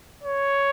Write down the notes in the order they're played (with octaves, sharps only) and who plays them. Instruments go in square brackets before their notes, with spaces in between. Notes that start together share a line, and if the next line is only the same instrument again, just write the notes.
[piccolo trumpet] C#5